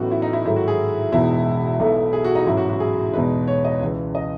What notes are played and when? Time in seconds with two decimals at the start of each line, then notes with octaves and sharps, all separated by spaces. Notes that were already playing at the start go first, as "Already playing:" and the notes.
Already playing: A1 A2 F#3 B3 D#4 F#4
0.11 E4
0.22 D#4
0.33 E4
0.45 G#2 D#3 F#3 A3 E4
0.56 F#4
0.68 G#4
1.12 E1 E2 B2 G#3 D#4 E4
1.79 B1 B2 A3 D#4
2.13 G#4
2.24 F#4
2.35 D#4
2.46 A1 G#2 F#3 E4
2.57 F#4
2.69 F#4
2.80 G#4
3.13 E2 B2 G#3 D#4 B4
3.48 C#5
3.65 D#5
3.81 C#2 C#3 E3
4.15 D#5